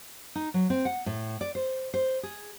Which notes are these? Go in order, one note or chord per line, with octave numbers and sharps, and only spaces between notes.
D#4
F#3
C4
F#5
A2
D5
C5
C5
G#4